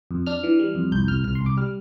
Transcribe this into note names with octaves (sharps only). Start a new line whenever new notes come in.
F2
D4 F6
E3
G3
F2
C2 G6
C2 F6
C2 F6
C6
C2
D6
G3 F6